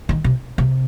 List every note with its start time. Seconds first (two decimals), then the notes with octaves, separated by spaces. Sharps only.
0.09 D#3
0.24 C3
0.58 C3